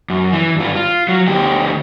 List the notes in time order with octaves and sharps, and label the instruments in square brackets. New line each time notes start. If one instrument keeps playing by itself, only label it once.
[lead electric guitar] F#2
E3
G2 F4
F4
F#3
D2 G4